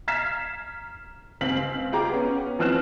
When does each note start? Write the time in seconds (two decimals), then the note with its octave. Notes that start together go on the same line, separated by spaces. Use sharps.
0.08 A#5 F6 G#6 B6 C7 E7
1.41 C#2 C4 F5 B6 F#7
1.92 F4 G#4 G5 A#5 D6
2.10 B3 C#4
2.59 E3 F3 C4 F6 F#6 E7